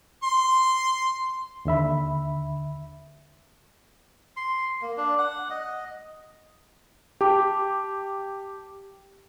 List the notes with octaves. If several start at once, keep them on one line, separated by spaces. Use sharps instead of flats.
C6
D#2 D3 E5 B5
C6
A#3
D4
F#5
D#5
G4 G5 A5 D6